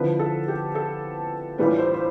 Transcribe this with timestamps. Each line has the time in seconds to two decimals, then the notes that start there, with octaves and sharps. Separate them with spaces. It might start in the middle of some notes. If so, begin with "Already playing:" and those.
Already playing: D3 F3 C4 E4 B4
0.19 A4
0.48 G4
0.75 A4
1.58 A2 E3 G3 D4 F4 B4
1.79 C5
1.94 C5